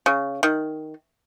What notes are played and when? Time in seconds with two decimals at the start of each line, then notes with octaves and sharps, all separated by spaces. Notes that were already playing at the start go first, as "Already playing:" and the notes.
0.06 C#3
0.43 D#3